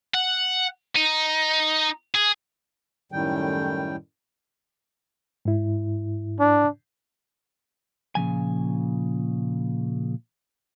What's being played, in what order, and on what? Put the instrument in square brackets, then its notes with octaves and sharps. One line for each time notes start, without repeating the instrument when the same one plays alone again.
[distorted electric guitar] F#5
D#4
G#4
[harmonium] F#2 A2 D#3 G3 G5
[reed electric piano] G#2 E4
[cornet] D4
[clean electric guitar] A#2 C#3 F3 G#5